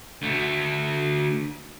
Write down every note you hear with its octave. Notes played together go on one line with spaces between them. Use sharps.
D2 A3